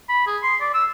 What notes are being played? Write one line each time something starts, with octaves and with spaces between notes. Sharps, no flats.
B5
G#4
C6
D5
E6